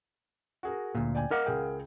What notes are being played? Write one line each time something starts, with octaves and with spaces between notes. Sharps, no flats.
F#4 G#4 A#4
D2 A#2
D5 G5 G#5
A#4 D#5 F5 F#5 D6
C#2 G#4 G5